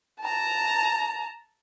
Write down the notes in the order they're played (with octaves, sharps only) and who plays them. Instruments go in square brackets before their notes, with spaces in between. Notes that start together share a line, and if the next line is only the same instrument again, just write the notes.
[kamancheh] A5 A#5